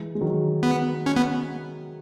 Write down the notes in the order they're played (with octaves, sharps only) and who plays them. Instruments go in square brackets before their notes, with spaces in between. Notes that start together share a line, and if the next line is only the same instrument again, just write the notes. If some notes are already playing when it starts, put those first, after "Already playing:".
Already playing: [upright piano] E3 G#3
G#3
D#3 F#3
[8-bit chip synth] B3
C#4
B3